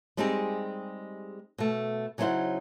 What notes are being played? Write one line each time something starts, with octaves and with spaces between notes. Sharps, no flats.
G3 G#3 C4 D#4 G4 G#4
B2 A3
C#3 F#3 D#4 E4 C5 F#5